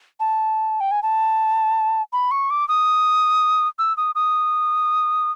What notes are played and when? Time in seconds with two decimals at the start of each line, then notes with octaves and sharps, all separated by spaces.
0.20 A5
0.80 G5
0.91 G#5
1.03 A5
2.13 B5
2.31 C#6
2.50 D6
2.68 D#6
3.79 E6
3.97 D#6
4.15 D#6